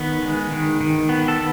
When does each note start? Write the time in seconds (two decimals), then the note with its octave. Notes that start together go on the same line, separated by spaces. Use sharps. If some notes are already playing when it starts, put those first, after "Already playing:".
Already playing: D#3 B3 B4
0.22 G#3
0.51 D#3
0.81 D#3
1.09 B3
1.28 A4